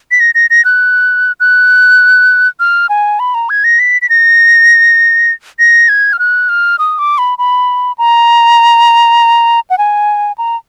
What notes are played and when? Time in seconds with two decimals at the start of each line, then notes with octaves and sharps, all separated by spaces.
0.11 B6
0.20 A#6
0.35 A#6
0.50 A#6
0.65 F#6
1.40 F#6
2.60 F6
2.89 G#5
3.20 B5
3.34 A#5
3.50 G#6
3.64 A#6
3.79 B6
4.02 B6
4.10 A#6
5.59 A#6
5.89 G#6
6.13 F6
6.19 F#6
6.49 F6
6.79 D#6
6.99 D6
7.18 B5
7.38 B5
7.98 A#5
9.70 F#5
9.78 G#5
10.38 A#5